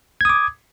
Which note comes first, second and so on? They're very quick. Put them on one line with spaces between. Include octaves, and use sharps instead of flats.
G#6 D#6 D6